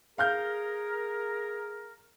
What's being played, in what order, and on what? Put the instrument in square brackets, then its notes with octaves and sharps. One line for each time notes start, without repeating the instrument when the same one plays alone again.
[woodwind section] G#4 A#4 [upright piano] F5 F6 G6